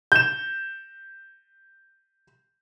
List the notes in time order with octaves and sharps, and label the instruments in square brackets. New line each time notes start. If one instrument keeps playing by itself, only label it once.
[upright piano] G6 E7